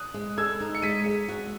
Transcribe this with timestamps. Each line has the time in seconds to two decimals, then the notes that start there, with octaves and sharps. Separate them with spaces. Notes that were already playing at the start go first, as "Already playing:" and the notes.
Already playing: D#6 F#6
0.14 G#3
0.38 A4 E6 G#6
0.60 D#4
0.75 C#7
0.82 G#3 B6 D#7
1.06 G#3
1.28 F#4